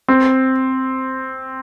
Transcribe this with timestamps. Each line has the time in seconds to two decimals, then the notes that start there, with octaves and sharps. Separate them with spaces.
0.08 C4